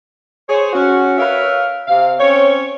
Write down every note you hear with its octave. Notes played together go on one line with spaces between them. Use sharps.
G#4 C5 C#5
C#4 F#4
A#4 B4 C#5 E5 F5
C3 F5
C4 C#4 C#5